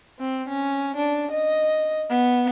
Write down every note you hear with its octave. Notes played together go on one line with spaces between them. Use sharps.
C4
C#4
D4
D#5
B3